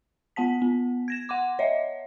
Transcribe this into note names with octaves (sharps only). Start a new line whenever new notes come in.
B3 F#5 A5 B6
B3
G#6 A#6 E7
F#5 C6 D6
C#5 D#5 E5